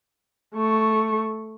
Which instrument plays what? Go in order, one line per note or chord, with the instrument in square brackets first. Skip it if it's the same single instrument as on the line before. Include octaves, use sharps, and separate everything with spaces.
[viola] A3 C#6